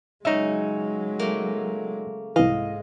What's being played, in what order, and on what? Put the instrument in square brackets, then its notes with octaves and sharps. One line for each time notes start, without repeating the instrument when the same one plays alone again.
[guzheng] C#3 C#4 [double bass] F#3 G#3 [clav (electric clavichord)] D#4 E5
[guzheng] A3 A#3
[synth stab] C2 E3 [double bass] G#2 G#3 [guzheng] D#5 [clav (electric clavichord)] F5